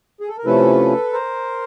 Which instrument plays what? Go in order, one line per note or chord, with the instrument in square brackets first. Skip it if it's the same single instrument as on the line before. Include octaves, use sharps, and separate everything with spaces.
[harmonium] G#4
A4
A#4
C3 F3 A3 C#4 E4 A4 B4
A#4 C5